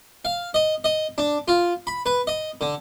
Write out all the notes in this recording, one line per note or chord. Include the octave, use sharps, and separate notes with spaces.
F5
D#5
D#5
D4
F4
B5
B4
D#5
D3